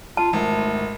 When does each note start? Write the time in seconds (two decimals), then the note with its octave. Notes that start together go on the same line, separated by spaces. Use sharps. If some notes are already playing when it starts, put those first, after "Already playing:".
0.17 F4 A5
0.33 G#1 A3